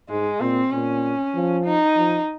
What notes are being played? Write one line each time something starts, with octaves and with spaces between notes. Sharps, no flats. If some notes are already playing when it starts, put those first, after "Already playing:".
G#2 G#3
A#2 C4
A#2 C#4
F3
D#4
F3